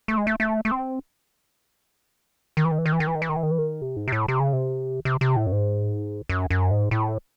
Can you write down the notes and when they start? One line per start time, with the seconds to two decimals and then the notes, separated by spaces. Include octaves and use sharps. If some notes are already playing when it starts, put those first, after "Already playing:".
0.08 A3
0.18 G#3
0.27 A3
0.40 A3
0.65 A3
0.71 C4
2.57 D#3
2.65 E3
2.71 D#3
2.78 E3
2.86 D#3
2.93 E3
3.00 D#3
3.07 E3
3.15 D#3
3.22 E3
3.29 D#3
3.36 E3
3.43 D#3
3.51 E3
3.58 D#3
3.82 C3
3.96 G#2
4.08 C3
4.12 A2
4.28 C3
4.40 C#3
4.53 C3
5.05 C3
5.21 C3
5.36 A2
5.47 F#2
5.52 G#2
6.29 F#2
6.50 F#2
6.71 G#2
6.91 A2